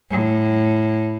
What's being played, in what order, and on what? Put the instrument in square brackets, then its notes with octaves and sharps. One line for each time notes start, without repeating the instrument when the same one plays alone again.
[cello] A2